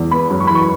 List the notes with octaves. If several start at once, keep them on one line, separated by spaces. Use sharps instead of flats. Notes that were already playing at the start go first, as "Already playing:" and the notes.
Already playing: E2
B3 B5
F#2
C#6
B5
E3
C#6